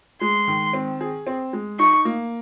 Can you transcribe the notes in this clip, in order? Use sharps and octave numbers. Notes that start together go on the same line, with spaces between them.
G#3 C6
D#3
C4
G#4
C4
G#3
D#4 C#6
A#3